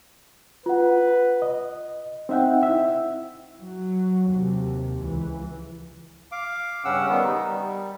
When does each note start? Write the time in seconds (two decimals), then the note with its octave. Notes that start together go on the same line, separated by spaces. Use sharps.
0.66 F4 B4 F#5
1.42 D#5
2.29 C4 D#4 E5 F#5 G5
2.63 E4 E5
3.61 F#3
4.29 D#2 C3
5.00 C#2 E3
6.32 F5 D6
6.85 G2 C#3 C#4 F#5 E6
7.09 D#3 G3 B3
7.24 D#4
7.47 G3